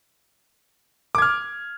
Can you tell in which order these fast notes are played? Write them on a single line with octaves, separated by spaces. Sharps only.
D6 G#6 F6